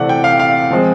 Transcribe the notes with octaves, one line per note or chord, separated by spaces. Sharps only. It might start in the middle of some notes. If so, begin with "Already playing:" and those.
Already playing: C3 E3 A3 C4 D5 F#5
G5
F5
F5
F3 G#3 C4